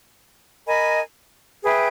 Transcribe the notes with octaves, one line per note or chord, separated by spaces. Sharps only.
A#4 D#5 G#5 B5
G#4 B4 E5 G5